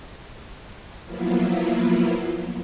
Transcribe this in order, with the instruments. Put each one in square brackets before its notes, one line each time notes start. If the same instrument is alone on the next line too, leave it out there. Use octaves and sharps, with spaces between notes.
[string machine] F3 F#3 A#3 B3 E4 F4